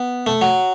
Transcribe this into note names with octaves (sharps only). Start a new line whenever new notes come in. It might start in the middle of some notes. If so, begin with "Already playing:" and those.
Already playing: B3
A3
F#3